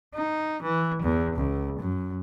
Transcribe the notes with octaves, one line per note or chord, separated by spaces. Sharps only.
D#4
E3
E2
C#2
F#2